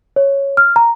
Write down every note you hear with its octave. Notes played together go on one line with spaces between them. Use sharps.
C#5
F6
A#5